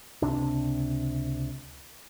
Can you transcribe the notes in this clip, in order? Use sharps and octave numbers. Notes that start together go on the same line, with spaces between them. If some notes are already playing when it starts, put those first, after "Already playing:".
C#2 C3 D4